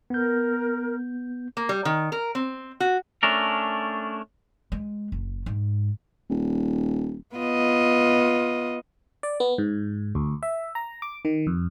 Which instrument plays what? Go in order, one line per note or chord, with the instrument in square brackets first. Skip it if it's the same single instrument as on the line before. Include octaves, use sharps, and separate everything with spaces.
[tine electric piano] B3 G6 [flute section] A#4
[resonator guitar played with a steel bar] A#3
G3
D#3
A#4
C4
F#4
[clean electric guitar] A3 C#4 D4 A#4
[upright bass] G#3
F#1
G#2
[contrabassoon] D#1
[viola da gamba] B3 F4 D#5
[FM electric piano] D5
B3
G#2
D2
E5
A#5
D6
D#3
F2